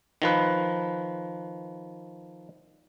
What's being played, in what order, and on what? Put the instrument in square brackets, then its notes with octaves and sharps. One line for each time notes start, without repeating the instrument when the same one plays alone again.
[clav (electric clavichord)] D#3 F3 B4